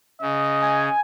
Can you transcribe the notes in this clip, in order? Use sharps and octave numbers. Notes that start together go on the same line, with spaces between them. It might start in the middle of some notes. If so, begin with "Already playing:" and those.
C#3 D#5
G#5